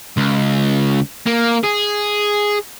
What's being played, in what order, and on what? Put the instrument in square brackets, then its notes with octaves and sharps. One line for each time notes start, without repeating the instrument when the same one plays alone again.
[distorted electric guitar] C#2
A#3
G#4